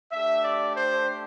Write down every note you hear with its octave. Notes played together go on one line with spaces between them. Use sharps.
A3 D4 G4 E5
D5
C5